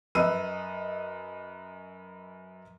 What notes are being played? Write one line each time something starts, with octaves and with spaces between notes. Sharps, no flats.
F#2 B4 D#5 E6 D#7